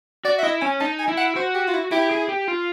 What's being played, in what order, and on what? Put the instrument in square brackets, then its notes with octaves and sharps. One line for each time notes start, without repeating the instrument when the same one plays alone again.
[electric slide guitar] F#4 [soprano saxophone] D5
[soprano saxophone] E5
[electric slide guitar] E4 [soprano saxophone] D#5
[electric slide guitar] C#4 [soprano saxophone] G#5
[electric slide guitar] D#4 [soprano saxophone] A5
[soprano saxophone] G#5
[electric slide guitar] E4
[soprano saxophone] F#5
[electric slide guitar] F#4 [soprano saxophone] C5
[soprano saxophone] G4
F4
E4
[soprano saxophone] E4 [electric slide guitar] G4
[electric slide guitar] G#4
G4
F4